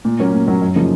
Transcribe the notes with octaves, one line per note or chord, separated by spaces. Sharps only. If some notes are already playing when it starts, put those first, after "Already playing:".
A#2
F#3 A#3 C#4
A#2
F#3 A#3 C#4
F#2
C#3 F3 A#3 D#4